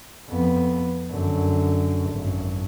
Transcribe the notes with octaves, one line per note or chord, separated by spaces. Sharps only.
F2 B3
F#2 D3
G#1 F#2